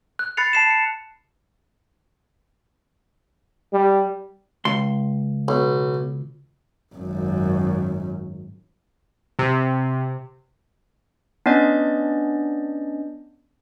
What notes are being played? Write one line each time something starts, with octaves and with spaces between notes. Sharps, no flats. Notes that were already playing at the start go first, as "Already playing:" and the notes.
F#6
B5 F#6 A6 C7 C#7 F7
A5 C7 E7
C#7
G3
C#2 C6
B1
G#1 F#2
C3
B3 C#4 D4 D5 D#5 G6